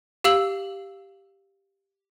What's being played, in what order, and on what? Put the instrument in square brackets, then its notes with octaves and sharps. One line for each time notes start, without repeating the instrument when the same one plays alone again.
[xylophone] G4 F5 E6 F#7